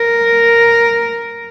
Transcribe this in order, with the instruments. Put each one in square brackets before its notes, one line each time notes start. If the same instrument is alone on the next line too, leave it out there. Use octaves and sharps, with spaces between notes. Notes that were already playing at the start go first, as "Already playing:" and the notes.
Already playing: [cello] A#4